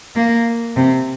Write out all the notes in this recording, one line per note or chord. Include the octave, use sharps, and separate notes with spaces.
A#3
C3